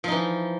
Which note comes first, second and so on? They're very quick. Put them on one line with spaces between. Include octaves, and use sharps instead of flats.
F3 D#4 E3